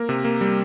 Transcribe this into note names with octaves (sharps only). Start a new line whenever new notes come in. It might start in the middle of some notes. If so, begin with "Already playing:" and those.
Already playing: A#3 A#4
C3
A#3
G3